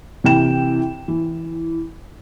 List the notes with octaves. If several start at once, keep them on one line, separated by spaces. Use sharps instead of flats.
C3 E3 G5 E7
E3